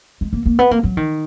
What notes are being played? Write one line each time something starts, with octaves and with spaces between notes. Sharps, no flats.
G#3
A#3
A#3
B3
A#3
F#3
D#3